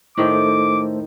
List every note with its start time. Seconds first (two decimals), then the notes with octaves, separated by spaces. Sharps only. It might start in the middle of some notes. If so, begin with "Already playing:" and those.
0.18 A2 D#3 A3 A4 C5 D6